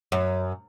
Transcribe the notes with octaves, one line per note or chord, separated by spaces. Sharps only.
F#2